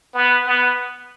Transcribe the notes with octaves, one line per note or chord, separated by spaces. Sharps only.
B3
B3